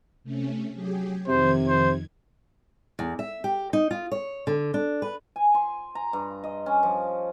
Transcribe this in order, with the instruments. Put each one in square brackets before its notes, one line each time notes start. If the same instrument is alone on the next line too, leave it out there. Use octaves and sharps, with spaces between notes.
[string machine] C3 A3 C#4
F#3 G4 G#4
[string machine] F2 D#3 G#6 [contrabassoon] C3 [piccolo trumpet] C5
[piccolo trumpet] C5
[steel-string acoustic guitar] E2
E5
G4
D#4
F4
C#5
D3
D4
B4
[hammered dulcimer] G#5
C6
A#5
G2
D#5
C#4
F3